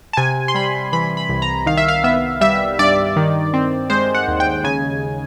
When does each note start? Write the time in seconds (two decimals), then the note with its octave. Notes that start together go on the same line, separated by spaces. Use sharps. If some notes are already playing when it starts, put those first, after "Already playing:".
0.13 A5
0.17 C3 G#5
0.48 C6
0.55 G3 B5
0.93 E3 B5
1.17 B5
1.29 C2
1.42 A#5
1.66 D#3 F5
1.77 E5
1.88 F5
2.04 B3 E5
2.41 G3 E5
2.79 G2 D5
3.16 D#3
3.54 C4
3.90 G#3 C5
4.15 F#5
4.28 D#2
4.40 G5
4.64 C#3 G#5